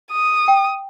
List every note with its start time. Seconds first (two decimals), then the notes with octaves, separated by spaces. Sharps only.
0.12 D#6
0.48 G5